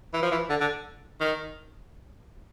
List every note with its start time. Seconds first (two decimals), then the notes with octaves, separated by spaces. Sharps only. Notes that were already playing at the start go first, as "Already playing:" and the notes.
0.14 E3
0.22 F3
0.31 E3
0.50 D3
0.61 D3
1.21 D#3